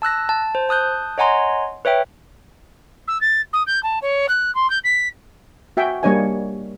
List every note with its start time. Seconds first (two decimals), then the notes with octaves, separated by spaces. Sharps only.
0.02 A5 E6 F#6 A#6
0.29 A5
0.55 C5
0.69 A5 D#6 F#6 G6
1.18 C#5 D#5 F#5 G#5 A#5 C6
1.85 B4 C#5 E5 G5
3.07 E6
3.21 A6
3.53 D#6
3.66 G6
3.83 A5
4.02 C#5
4.28 F#6
4.55 C6
4.70 G6
4.84 B6
5.77 F#4 E5 G5 G#5
6.03 G3 A#3 D4 C#5 D#5 G#5